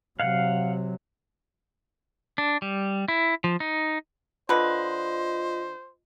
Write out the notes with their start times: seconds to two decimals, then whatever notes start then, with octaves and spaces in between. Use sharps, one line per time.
0.20 C3 F#3 F5 F#5
2.38 D4
2.62 G3
3.08 E4
3.44 F3
3.60 D#4
4.49 D3 F4 B4 C5 D#5